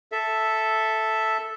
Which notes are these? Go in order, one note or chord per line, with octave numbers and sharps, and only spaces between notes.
A4 E5